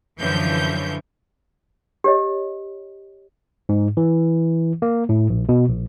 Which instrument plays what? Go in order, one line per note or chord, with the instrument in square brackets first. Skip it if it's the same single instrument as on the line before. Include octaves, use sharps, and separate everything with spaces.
[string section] F#2 D3 E3 F3 C#5 G6
[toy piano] G4 C#5 D#5
[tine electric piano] G#2
E3
A#3
A2
A#1
B2
A#1